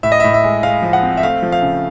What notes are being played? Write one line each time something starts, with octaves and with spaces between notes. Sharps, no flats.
A2 E5
D#5
A2 E5
E5
G#3
G#3 F5
F3
F#5
C4
E5
A3 F5
F3
F5
C#3